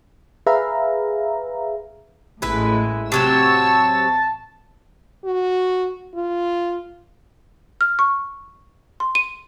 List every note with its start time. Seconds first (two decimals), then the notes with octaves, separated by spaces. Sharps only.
0.46 G#4 B4 E5 F5 A#5
2.42 A1 A2 G#3 E4 B4
3.12 C3 F#3 C4 A5 C#6 E6
5.25 F#4
6.15 F4
7.81 F6
7.99 C#6
9.00 C6
9.15 D#7